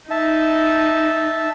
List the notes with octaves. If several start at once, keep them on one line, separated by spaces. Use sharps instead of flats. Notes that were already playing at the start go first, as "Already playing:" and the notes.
D#4 E5 A5